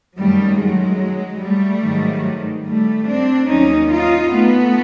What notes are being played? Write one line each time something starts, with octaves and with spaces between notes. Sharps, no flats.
F#2 D#3 F#3 G3 A3
F#3 G#3
G3 A3
G#2 D#3 F#3
G3 A3
C4 D4
D#2 D#3 F#3 C#4 D#4
D#4 F4
A3 B3